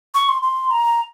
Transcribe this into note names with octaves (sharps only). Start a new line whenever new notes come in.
C#6
C6
C6
A#5